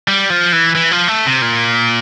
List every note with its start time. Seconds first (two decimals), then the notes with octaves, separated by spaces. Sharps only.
0.08 G3
0.30 F3
0.52 E3
0.75 E3
0.91 F3
1.08 A3
1.26 C3
1.42 A#2